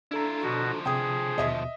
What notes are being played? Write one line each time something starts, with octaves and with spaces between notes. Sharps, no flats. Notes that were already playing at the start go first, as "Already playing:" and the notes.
D4 E4 F4 A4 A#5
B2 D3 F3 F#4
C3 G#4 G5 D#6
D#2 B2 D#5 E5 D#6